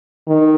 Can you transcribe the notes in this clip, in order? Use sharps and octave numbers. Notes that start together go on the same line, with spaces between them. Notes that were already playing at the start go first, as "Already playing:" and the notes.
D#3